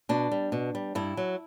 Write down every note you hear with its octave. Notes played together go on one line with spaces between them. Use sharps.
B2 D4
G3
B2
G3
G2 E4
F#3